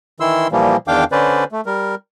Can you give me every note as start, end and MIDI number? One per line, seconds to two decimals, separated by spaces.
0.20 0.47 51
0.20 0.47 52
0.20 0.47 64
0.20 0.47 84
0.20 0.47 88
0.52 0.76 46
0.52 0.76 52
0.52 0.76 53
0.52 0.76 55
0.52 0.76 58
0.88 1.04 40
0.88 1.04 51
0.88 1.04 62
0.88 1.04 77
0.88 1.04 79
0.88 1.04 86
1.12 1.44 50
1.12 1.44 61
1.12 1.44 71
1.12 1.44 72
1.12 1.44 74
1.52 1.61 57
1.66 1.95 55
1.66 1.95 70